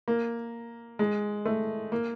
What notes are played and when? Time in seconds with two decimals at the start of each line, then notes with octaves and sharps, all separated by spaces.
0.08 A#3
0.99 G#3
1.45 A3
1.92 A#3